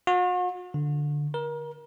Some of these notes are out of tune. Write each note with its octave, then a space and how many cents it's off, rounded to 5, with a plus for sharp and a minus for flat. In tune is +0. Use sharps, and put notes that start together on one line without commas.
F#4 -45
D3 +5
A#4 +30